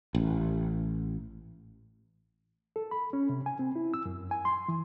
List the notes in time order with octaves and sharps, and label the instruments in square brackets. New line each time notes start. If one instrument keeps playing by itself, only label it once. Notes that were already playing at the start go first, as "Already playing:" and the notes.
[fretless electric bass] A1
[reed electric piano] A4
B5
C#4
C3
G#5
C4
E4
E6
F#2
G#5
C6
E3